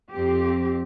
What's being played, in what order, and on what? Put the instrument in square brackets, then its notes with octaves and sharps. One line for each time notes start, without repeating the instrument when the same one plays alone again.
[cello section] F2 C4 G4